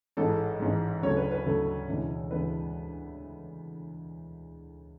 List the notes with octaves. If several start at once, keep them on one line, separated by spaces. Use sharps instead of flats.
A1 G#2 G#3 A4
A1 G#2 G#3
D2 C#3 F#3 A3 C#5
B4
B4
D2 C#3 F#3 A3 A4
E1 D2 C#3 E3 G#3
E1 D2 C#3 E3 G#3 B4